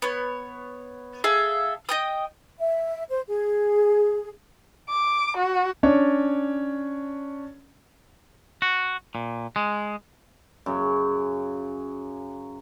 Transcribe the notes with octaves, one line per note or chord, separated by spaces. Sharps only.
B3 C#5
G#4 A4 E5 F5
D#5 G5 D#6
E5
C5
G#4
D6
F#4
C#4 D4 C#5 D5
F#4
A#2
G#3
F#2 C#3